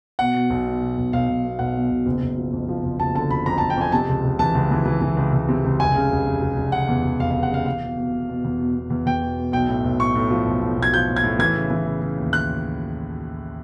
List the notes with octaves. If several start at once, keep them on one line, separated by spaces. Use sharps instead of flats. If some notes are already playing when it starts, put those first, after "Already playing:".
B2 F#5
B2
B1
B2
B2
B1
B1 F5
B1
B2
B1 F#5
B2
B1
F#1
F#1
F3
F2
F3
F#1
F#1 A5
D3 A5
F#1 B5
F2 A#5
A5
F2
G5
F2 G#5
C3 A5
C#2
C#2
E3 A5
C#2
E3
E3
E3
C#2
C#2
C3
C#2
F1 G#5
C#3
F1
F1
F1
F1
C#3 F#5
E2
F1
F1 F5
F5
F1
F#5
C#3 F5
E2 F5
B2
B2
B2
B2
E2
B2
B2
E2
E2 G5
B2
B2
B1 G5
A2
B1
A2 C#6
A2
F3
B1
A2
B1
G#6
F3 G6
A2
G#6
A2
E3 G#6
C#3
E3
C#3
C#3
D#2
F#6